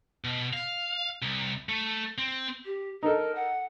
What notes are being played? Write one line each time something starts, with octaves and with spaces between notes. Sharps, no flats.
B2
F5
C2
A3
C4
G4
D#4 A4 A#4
F#5